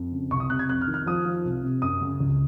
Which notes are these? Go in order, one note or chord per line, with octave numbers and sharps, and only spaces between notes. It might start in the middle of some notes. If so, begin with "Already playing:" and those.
Already playing: F2
C#3
C2 C#6
D#6
C3 F#6
G#6
F2 F#6
F6
D#3
F6
F3 D#6
F3
C2
C3
F#2 D#6
C#3
C#2